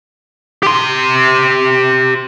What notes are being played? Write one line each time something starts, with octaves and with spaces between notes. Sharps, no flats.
G4 C6